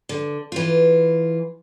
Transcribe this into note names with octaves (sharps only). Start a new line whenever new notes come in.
D3
E3 F4